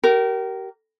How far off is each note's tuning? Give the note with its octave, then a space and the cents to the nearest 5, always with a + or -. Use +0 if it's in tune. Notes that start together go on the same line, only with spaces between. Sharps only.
G4 -35 A#4 +0